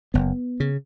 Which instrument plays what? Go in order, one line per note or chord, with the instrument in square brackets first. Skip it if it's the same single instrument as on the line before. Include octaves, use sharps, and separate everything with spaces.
[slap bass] F#1 B3
C#3